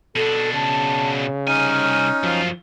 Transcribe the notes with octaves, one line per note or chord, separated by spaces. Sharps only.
B2 D4 A4
C#3 A5
C2 C#4 D#4 G#5 F6
F#2 F3 F4